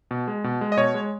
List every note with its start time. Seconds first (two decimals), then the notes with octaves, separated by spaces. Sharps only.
0.11 B2
0.28 G#3
0.44 B2
0.61 G#3
0.72 D#5
0.77 B2 C#5
0.94 G#3